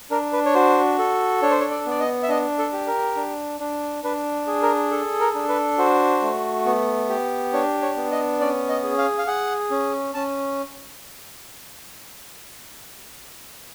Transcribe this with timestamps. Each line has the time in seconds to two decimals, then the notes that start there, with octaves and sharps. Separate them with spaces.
0.11 D4 A#4
0.33 B4
0.46 C#5
0.54 F#4 C5
0.99 A4
1.42 D4 C#5
1.51 C5
1.60 C#5
1.71 D5
1.86 B3 D5
2.00 D#5
2.23 E5
2.29 D4 D#5
2.59 A4
2.73 G4
2.87 A#4
3.16 D4
3.60 D4
4.03 D4 B4
4.47 G#4
4.62 A#4
4.91 A4
5.20 A#4
5.35 D4
5.49 B4
5.78 F#4 C5
6.22 A3
6.66 B3
7.09 G4
7.53 D4 C#5
7.82 C#5
7.96 B3
8.12 D#5
8.40 C#4 D5
8.69 D#5
8.83 G#4
8.98 F5
9.18 F5
9.27 G#4 F#5
9.70 C#4
10.14 C#4 A5